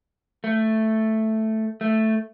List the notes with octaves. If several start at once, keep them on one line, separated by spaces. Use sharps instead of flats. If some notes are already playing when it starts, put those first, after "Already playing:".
A3
A3